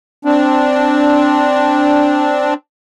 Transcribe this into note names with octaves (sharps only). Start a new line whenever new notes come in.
C4 D4